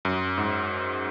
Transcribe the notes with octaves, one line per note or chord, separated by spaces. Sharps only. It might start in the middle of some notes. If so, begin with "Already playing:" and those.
F#2
G#2